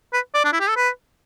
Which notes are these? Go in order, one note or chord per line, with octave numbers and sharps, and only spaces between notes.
B4
D5
D4
E4
G4
A4
B4